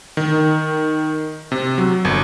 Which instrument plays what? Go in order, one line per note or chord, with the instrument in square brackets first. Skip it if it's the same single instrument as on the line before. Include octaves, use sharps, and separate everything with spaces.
[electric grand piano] D#3
C3
F#3
G1